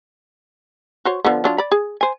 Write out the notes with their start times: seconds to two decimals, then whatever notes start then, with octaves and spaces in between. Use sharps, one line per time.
1.05 F#4 C5 C#5
1.24 D3 F3 B3
1.44 F#3 D4 F4
1.58 D5 B5
1.72 G#4
2.01 C5 G#5